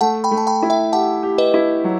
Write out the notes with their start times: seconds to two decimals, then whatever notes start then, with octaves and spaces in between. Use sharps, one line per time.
0.01 A3 F#5 A5
0.24 G5 B5
0.31 A3
0.37 A5
0.47 G5 B5
0.63 E4
0.70 E5 G5
0.93 G4 F#5 A5
1.23 G4
1.38 B4 D#5
1.54 E4
1.84 F#3